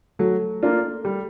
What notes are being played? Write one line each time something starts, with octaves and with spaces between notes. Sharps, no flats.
F#3 A3 A4
A#3 D4 F4
G3